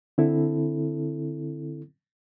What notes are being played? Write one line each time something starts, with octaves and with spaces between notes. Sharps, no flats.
D3 C4 E4 A4